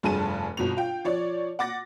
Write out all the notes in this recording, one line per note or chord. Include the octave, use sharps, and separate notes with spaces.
F1 G2 G#4 A5 D#7
G1 B2 F7
F4 G5
F3 C#5 D5
F#5 D6 A6 A#6